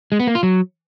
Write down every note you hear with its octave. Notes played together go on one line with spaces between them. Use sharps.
G#3
B3
A#3
F4
F#3